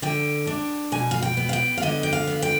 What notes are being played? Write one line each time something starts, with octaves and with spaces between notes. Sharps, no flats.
D3 G5
D4
B2 G#5
F5
G5
B3
F5
G5
F5
D3 D#5
G5
F5
B3
G5